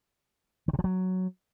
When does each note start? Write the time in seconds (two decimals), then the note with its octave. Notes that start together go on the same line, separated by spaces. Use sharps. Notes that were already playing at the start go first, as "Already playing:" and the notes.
0.68 D#3
0.73 C3
0.79 F3
0.84 F#3